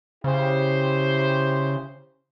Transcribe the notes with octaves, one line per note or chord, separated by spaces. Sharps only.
C#3 E4 G4 C5